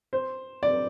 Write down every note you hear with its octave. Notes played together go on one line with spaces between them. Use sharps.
C5
D5